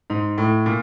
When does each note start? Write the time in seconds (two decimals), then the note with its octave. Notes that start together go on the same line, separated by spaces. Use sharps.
0.10 G#2
0.38 A2
0.66 A#2